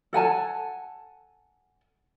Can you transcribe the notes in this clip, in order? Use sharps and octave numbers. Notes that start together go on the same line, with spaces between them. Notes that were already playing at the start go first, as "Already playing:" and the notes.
A4 F#5 G#5 A5